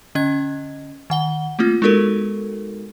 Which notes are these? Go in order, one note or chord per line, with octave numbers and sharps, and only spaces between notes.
D3 C#4 D#5 G#6
D#3 F#5 G7
A3 A#3 C4 F4
G#3 B3 D#4 F#4 A4 A#4